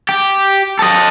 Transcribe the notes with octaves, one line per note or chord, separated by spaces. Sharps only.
G4
A4 D#5